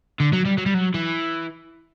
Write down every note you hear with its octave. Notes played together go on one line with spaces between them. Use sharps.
D3
F#3
G3
F#3
G3
F#3
E3